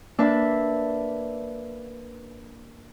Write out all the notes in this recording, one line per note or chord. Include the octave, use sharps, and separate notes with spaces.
A#3 D4 B4 E5